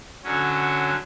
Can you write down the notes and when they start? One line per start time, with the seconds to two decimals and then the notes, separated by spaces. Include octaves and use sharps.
0.24 D3 F#3 C#4